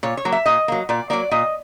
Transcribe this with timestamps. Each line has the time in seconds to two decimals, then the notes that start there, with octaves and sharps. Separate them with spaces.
0.03 A#2 C#5
0.17 C#5
0.25 F#3 A#3
0.32 E5
0.46 A#2 D#5
0.68 F#3 A#3
0.89 A#2 D5
1.10 F#3 A#3 D5
1.31 A#2 D#5